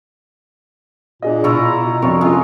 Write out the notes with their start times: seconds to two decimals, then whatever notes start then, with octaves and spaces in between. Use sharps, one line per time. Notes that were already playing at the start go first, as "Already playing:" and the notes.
1.22 A#2 D4 G#4 D#5
1.44 B2 E4 F4 A#5 C#6 E6
1.84 B2
2.02 F2 C3 F4 A#4 C#5 D5 C#6
2.21 G#3 C#4 E4 F4 D#5